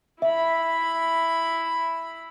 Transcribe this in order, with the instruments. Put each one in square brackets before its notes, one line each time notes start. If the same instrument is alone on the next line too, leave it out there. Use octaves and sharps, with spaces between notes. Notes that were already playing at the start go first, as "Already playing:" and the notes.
[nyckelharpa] E4 B5 [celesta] E5